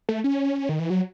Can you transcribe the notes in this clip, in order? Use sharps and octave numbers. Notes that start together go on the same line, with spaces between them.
A3
C#4
D#3
E3
F#3